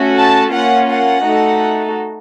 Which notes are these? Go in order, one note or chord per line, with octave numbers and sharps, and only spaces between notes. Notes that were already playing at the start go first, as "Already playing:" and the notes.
Already playing: A3 C#4 F#4
A5
A#3 C#4 F4 F#5
F#5
A3 D#4 F#4 A4